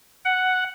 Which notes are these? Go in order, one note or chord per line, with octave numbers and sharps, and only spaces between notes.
F#5